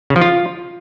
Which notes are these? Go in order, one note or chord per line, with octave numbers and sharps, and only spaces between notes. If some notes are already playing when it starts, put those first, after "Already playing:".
C#3
F3
F4